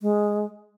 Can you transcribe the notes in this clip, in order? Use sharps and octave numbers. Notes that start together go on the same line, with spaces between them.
G#3